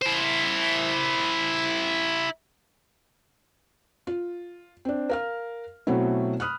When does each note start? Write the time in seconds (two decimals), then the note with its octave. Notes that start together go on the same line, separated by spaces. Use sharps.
0.02 E4 C5
4.07 F4
4.85 C4 D4
5.10 A#4 F5 F6
5.87 B2 F#3 A3 C4 E4
6.40 B5 D#6 F6 F#6